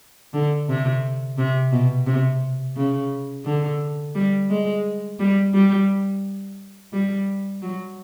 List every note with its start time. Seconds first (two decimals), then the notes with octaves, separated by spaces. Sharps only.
0.34 D3
0.68 C3
1.38 C3
1.72 B2
2.06 C3
2.76 C#3
3.45 D3
4.15 G3
4.50 G#3
5.20 G3
5.54 G3
6.93 G3
7.62 F#3